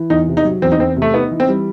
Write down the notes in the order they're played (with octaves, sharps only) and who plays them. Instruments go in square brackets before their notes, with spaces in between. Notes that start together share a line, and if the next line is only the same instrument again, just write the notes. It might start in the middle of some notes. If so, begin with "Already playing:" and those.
Already playing: [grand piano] E3
[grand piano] E2 [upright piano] D#4
[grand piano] C3
[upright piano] D#4
[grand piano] F#3
[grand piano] E2 [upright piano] C4
[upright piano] D#4
[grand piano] E2 [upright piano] C4
[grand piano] C3
[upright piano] A3
[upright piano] B3 [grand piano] D#4
[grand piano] E3
[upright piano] C4
[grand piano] G3